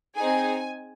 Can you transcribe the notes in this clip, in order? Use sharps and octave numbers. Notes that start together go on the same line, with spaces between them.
C4 D#4 G#4 G#5